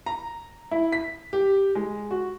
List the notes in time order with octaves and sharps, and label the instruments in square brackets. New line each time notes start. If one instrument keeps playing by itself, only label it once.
[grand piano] A#5
E4
B6
G4
G#3
F#4